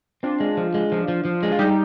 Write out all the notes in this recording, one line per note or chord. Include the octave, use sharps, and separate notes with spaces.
C4 D4 F4
G#3
F3
G#3
F3
F3
F3
G#3
F4
G3 D#4 G4